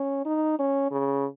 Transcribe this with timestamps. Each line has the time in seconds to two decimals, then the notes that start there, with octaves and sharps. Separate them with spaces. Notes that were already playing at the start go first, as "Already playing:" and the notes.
Already playing: C#4
0.25 D#4
0.59 C#4
0.91 C#3